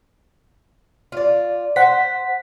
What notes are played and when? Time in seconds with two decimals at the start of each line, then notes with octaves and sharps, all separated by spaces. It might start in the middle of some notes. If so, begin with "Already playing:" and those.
1.12 F4 D5
1.76 C5 F#5 B6